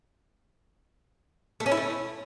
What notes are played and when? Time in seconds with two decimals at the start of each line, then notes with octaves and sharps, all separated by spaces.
1.60 A3
1.66 C#4
1.71 E4
1.77 A3